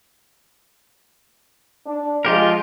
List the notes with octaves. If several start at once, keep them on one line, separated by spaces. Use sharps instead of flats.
D4
F3 G#3 F4 G4 A#4